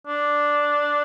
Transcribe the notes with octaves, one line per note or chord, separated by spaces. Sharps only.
D4